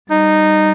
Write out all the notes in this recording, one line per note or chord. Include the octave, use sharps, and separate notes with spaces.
G3 D#4